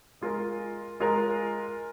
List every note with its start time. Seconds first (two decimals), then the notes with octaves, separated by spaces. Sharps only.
0.21 G#3 F4 A#4
1.00 G#3 F4 A#4